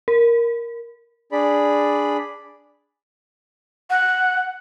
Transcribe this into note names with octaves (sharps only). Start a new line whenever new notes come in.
A#4
D4 G#4 D5 B5
F#5